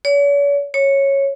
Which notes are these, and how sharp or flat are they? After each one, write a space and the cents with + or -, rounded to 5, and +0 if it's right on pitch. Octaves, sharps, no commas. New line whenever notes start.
C#5 +45
C#5 -10